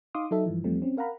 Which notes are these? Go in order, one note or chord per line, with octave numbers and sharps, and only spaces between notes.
D#4 F5 C6 D6 D#6
F#3 D#4 A4 E5
G2 E3 F3
E2 F3 G3 A3 C4
C4 C#4
A#4 F5 F#5 A#5 B5